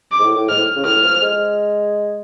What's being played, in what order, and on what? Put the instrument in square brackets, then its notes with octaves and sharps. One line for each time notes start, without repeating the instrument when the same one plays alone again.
[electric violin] D6
[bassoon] G#2
A2
A2
[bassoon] G#2 [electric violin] F6
[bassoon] A2
C#3
[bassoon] A2 [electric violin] F6
[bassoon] F3
G#3